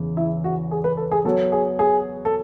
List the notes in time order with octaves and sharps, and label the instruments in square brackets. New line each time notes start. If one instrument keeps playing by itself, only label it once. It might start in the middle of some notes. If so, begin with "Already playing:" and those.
Already playing: [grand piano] E2 C#3 E3
[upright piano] E4
F#4
G#4
B4
A4
G#4
[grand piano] F#3 B3 F#4 C#5 [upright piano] A4
[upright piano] G#4
G#4
A4